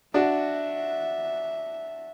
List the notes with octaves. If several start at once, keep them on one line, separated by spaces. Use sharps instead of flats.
D4 F#4 E5